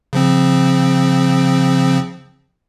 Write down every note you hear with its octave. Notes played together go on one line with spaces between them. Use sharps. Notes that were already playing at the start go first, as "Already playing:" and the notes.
C#3 F3 C4